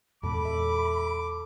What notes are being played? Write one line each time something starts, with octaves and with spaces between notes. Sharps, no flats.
E2 A#2 G#3 A4 B5 D6
E5